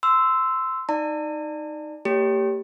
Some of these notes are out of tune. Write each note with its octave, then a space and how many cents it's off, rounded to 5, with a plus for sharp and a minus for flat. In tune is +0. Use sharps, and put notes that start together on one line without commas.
C6 -15 E6 +0
D#4 +0 D5 +20 A#5 -45
A#3 -40 G4 +0 C#5 +25